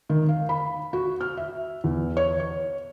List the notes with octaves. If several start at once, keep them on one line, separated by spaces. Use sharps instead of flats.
D#3
F5
B5
F#4
F6
E5
E2
C#5
C#5